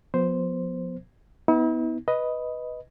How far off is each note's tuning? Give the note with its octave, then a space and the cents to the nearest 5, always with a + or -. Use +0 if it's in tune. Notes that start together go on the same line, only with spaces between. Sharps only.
F3 +35 B3 +0 C5 +0
B3 +5 E4 -45
B4 +0 D#5 +5